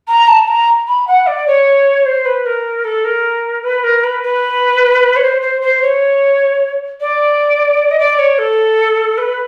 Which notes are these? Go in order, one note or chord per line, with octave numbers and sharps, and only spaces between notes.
A#5
A5
A#5
B5
F#5
D5
C#5
C5
B4
A#4
A4
A#4
B4
A#4
B4
B4
C#5
C5
C5
C5
C#5
D5
D#5
D5
C#5
A4
B4